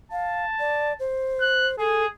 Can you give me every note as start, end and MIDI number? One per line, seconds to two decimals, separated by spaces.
0.12 0.45 77
0.12 1.00 81
0.60 0.93 74
1.00 1.76 72
1.41 1.71 90
1.79 2.07 68
1.79 2.05 69